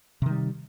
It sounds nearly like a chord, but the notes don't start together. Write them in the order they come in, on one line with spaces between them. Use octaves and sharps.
C3 D#3 G3